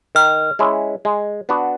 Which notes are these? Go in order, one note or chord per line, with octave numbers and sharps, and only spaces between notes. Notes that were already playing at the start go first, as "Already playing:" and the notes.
D#3 F6
G#3 C#4 E4
G#3
B3 D4 F#4